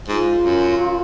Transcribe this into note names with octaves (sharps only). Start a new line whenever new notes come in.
G#2 F4
F#2